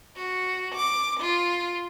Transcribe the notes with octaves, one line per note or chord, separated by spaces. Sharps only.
F#4
D6
F4